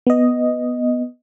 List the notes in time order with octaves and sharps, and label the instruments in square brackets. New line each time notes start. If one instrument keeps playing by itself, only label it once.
[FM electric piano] B3 D#5